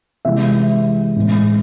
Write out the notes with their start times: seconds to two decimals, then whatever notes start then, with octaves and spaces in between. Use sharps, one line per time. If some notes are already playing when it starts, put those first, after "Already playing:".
0.25 C3 E3 G#3 E5
1.16 A2 G#3